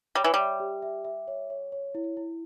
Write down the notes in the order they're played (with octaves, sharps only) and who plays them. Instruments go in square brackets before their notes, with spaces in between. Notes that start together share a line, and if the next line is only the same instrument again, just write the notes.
[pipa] G3 [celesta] C#5
[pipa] E3
[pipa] G3 [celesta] E5
[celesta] G4
E5
E5
C#5
C#5
C#5
E4
E4